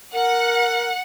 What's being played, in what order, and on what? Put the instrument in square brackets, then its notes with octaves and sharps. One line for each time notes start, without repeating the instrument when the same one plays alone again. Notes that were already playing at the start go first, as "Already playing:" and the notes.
[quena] A#4 [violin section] F#5